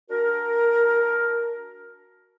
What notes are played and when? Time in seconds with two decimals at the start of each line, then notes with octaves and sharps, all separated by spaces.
0.09 D4 F#4 A#4